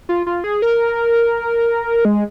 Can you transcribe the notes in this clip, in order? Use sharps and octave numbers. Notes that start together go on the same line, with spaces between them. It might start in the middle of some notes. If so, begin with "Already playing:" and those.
F4
F4
G#4
A#4
G#3